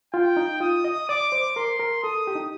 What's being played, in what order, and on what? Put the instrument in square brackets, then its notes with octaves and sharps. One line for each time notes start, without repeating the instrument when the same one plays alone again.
[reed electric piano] F4 [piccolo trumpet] G5
[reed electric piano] D#4
[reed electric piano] F4 [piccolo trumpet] D#6
[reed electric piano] D#5
[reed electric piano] D5 [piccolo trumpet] D6
[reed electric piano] C5
[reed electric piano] A#4 [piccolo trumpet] C6
[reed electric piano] A#4
[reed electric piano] A4 [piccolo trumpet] D#6
[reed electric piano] G4
D#4